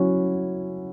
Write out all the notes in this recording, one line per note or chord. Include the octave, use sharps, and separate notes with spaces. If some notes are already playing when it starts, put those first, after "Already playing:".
Already playing: F#3 C#4 E4 F#4